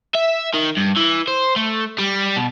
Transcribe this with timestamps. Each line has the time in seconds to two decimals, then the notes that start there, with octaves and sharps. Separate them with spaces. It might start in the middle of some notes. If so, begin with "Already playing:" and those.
0.15 E5
0.54 D#3
0.77 G2
0.96 E3
1.27 C5
1.56 A3
1.98 G3
2.36 B2